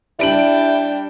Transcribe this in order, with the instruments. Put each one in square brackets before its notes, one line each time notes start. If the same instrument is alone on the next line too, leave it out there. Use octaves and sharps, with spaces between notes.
[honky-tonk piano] G3 D7 F#7 [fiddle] D4 G5 [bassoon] E4